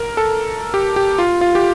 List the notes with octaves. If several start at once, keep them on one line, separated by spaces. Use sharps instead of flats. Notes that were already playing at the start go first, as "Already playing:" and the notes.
Already playing: A#4
A4
G4
G4
F4
F4
G4